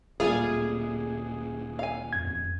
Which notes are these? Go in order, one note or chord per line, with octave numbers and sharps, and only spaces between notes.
D1 A#2 G3 A3 F4 G#4
F5 G#5
F2 G#6